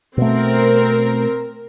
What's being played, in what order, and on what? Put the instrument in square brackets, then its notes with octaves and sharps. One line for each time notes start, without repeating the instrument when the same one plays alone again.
[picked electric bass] B2 A3 [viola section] C4 A#4